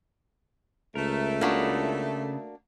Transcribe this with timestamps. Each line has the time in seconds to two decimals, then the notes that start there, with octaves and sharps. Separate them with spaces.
0.95 C#2 A3 A#4
1.41 C#3 A#3 D4 F#4 B5 D#6